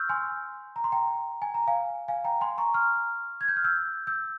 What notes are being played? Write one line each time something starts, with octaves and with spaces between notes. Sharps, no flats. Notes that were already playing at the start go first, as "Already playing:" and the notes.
Already playing: C#6 E6 F6 G6
G#5 C6
A#5
C6
G5 A#5
G#5
A#5
F5 G#5
F5 G#5
G5 A#5
G#5 C6
A#5 C#6
C#6 F6
G#6
G6
F6
E6 G6
E6 G6